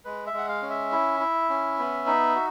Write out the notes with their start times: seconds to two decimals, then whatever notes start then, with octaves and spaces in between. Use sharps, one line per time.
0.05 G#3 B4
0.26 E5
0.33 G#3 F#5
0.48 F5
0.62 C#4
0.70 E5
0.92 E4
1.20 E4
1.50 C#4
1.78 B3
2.07 D#4
2.36 F#4